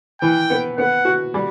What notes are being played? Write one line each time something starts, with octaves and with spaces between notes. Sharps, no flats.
E3 G5
B3
B3 F#5
F#4
G3